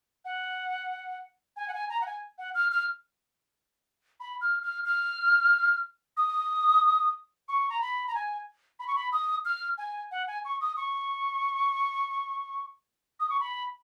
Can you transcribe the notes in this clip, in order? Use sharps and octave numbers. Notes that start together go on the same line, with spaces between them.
F#5
G#5
F#5
G#5
A#5
F#5
G#5
F#5
F6
F6
B5
F6
F6
F6
D#6
C#6
A#5
B5
A#5
G#5
B5
C#6
B5
D#6
F6
G#5
F#5
G#5
C#6
D#6
C#6
D#6
C#6
B5